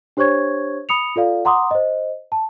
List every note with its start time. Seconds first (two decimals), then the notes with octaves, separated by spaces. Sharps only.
0.17 D4 G4 C5 C#5 C#6 G#6
0.89 B5 D#6 C#7 F7
1.16 F4 A4 D5 F5
1.45 F#5 A#5 C6 D6 D#6
1.71 C5 D#5
2.32 A5